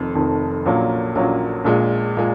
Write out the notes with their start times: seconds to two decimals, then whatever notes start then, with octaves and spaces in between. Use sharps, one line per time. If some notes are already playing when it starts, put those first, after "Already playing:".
Already playing: F1 F2 D#3
0.15 F1 F2 D#3
0.65 A#1 A#2 F#3 A#3 C#4
1.15 A#1 A#2 F#3 A#3 C#4
1.65 A#1 A#2 G#3
2.17 A#2 G#3